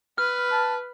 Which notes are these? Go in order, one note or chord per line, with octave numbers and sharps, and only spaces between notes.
B4 F6
A5